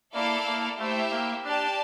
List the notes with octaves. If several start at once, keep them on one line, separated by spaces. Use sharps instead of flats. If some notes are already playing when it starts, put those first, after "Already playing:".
A#3 E4 A4 D5 F5 A5
A#3
A3 E4 G4 C5 E5
A#3
D4 G4 D5 A5